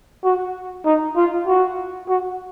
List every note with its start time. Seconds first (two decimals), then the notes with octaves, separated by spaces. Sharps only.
0.24 F#4
0.86 D#4
1.16 F4
1.47 F#4
2.09 F#4